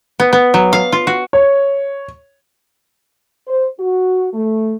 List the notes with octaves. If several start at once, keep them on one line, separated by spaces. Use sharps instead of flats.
B3
B3
F#3
F5
F4
F#4
C#5
C5
F#4
A3